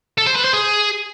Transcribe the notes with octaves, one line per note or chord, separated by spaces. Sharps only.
A4
C5
B4
C5
G#4